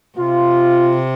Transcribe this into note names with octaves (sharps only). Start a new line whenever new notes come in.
C3 F4